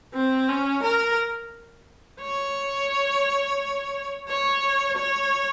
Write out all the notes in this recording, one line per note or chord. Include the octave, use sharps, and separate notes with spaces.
C4
C#4
A#4
C#5
C#5
C#5